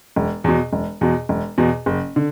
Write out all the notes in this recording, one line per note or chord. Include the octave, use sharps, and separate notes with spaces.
E1
E2 B2
E1
E2 B2
E1
E2 B2
F#1
D3